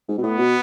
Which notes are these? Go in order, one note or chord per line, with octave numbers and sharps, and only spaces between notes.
G#2
B2
A2 B3
B2